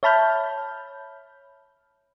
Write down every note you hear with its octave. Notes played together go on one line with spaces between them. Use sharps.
C#5 E5 A5 B5 F6 G6